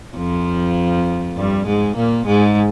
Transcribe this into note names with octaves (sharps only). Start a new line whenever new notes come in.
F2 F3
G2 G3
G#2 G#3
A#2 A#3
G#2 G#3